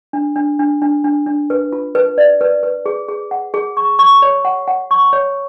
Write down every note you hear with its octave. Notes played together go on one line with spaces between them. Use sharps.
D4
D4
D4
D4
D4
D4
B4
F4
B4
D5
B4
B4
G#4
G#4
F#5
G#4
C#6
C#6
C#5
F#5
F#5
C#6
C#5